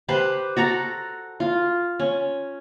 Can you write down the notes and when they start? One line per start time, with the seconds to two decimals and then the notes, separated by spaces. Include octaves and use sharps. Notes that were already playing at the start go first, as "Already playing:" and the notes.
0.08 G4 B4 C5
0.57 F#4 A4 A#5
1.40 F4
2.00 C#4